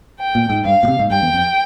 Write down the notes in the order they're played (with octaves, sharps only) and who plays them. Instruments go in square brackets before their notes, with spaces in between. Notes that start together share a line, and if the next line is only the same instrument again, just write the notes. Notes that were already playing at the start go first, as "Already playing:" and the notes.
[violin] G5
[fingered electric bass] A#2
G#2
[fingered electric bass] G2 [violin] F5
[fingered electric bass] A#2
C3
G#2
[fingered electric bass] G2 [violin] G5
[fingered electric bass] E2
F2